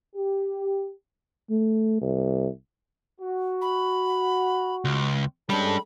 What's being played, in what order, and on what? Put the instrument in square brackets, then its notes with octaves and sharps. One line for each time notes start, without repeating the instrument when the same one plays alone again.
[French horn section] G4
[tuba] A3
C2
[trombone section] F#4
[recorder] B5
[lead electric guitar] C#2
[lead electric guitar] G3 D4 [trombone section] G#3 C#4 A4 [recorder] B5